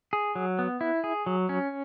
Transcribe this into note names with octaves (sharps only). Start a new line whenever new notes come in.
G#4
F#3
B3
E4
G#4
F#3
C#4